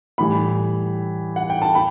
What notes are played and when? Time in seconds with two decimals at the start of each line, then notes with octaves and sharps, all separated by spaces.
0.18 A2 E3 G3 B5
1.36 F#5
1.50 G5
1.62 A5
1.75 B5